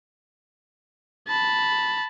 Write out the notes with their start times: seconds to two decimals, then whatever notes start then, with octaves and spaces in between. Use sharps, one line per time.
1.28 A5 B5